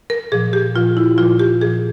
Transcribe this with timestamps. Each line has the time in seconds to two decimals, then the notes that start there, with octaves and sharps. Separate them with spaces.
0.10 A#4
0.32 A#2 F3 G#4
0.53 G4
0.75 A#2 F3 F4
0.97 E4
1.18 A#2 F3 F4
1.39 G4
1.61 A#2 F3 G#4